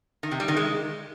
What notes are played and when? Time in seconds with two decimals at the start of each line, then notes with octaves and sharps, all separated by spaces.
0.23 D#3
0.31 C3
0.40 G3
0.48 D#3
0.57 G#3